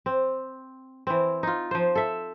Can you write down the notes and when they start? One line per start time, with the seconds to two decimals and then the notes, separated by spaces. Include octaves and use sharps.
0.06 C4
1.07 E3 C4
1.43 D#4 F4
1.71 F3 C5
1.95 A4 E5